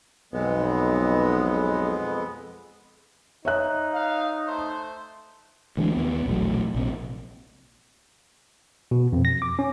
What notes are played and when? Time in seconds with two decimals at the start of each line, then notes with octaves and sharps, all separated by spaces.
0.33 B1 F2 G#3 B3
3.45 D#4 C#5 E5 F#6
3.94 F5
4.47 A3 C5
5.77 D2 E3 G#3 D4
5.94 D#2 B3
6.26 E1 A#1 F#3 A3
6.75 A#1 C3 A#3
8.91 B2
9.13 F2
9.25 A#6
9.42 D6
9.59 C#4